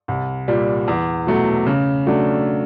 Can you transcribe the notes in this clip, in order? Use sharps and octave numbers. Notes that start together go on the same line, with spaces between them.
C2
A#2 G3
E2
B2 F#3 A3
C#3
F#3 A3 D4